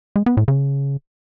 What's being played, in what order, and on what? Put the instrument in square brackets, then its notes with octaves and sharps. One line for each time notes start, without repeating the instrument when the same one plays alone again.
[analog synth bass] G#3
B3
A2
C#3